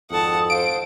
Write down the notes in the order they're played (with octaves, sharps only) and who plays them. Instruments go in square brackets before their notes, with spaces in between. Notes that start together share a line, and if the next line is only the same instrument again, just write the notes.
[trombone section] G#1 F2 A4 [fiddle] F#5 A5 [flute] D#6
[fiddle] C5 [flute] F5 [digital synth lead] D7